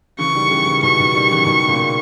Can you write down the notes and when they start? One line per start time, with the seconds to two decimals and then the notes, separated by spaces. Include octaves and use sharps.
0.19 C#3 E3 C#6
0.35 D#3 G3
0.51 C#3 E3
0.66 C#3 E3
0.83 B2 D#3 C#6
0.99 B2 D#3
1.14 D#3 G3
1.31 C#3 E3
1.46 B2 D#3
1.68 A#2 C#3